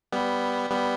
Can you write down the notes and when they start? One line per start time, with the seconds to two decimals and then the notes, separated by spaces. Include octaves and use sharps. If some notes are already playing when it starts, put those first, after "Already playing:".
0.12 G3 B3
0.70 G3 B3